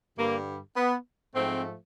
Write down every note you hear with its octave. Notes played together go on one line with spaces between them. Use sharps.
G2 D3 G3 A#3
B3
G#2 F3 A3 C4